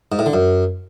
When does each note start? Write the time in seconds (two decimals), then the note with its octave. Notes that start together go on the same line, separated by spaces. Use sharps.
0.12 G#2
0.19 A2
0.26 D3
0.33 F#2